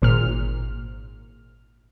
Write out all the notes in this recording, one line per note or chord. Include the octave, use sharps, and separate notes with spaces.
G#1 A#2 F6